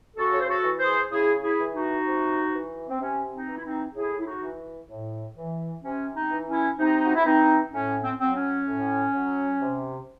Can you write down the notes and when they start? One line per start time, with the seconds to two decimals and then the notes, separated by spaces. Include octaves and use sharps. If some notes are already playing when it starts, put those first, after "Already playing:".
0.17 C#3 F#4 A4
0.32 C#5
0.40 C5
0.48 F#4 A4
0.64 E3
0.79 G#4 C5
1.12 C#3 E4 G#4
1.43 E4 G#4
1.59 E3
1.74 D#4 F#4
2.06 C3
2.53 E3
2.89 C4
3.00 C3 C#4
3.32 C4 D#4
3.48 E3
3.57 E4
3.63 C4 D#4
3.95 A2 E4 G#4
4.19 E4
4.26 D#4 F#4
4.42 E3
4.89 A2
5.36 E3
5.84 C3 C#4
6.15 C4 D#4
6.31 E3
6.46 C#4 E4
6.78 C3 C4 D#4
7.04 F#4
7.15 E4
7.25 E3 C4 D#4
7.72 A2 C#4
8.03 C4
8.20 F#3 C4
8.35 C#4
8.67 A2
9.14 F#3
9.62 C3